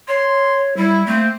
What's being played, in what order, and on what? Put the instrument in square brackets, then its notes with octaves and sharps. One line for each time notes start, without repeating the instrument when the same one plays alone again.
[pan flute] C#5 [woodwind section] C6
[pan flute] G3 [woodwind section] E4
[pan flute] A3 [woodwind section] A#3 C4